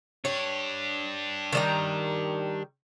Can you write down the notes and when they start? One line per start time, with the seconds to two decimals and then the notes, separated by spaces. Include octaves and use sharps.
0.25 D4 G4 C#5
1.52 D#3 G3 A#5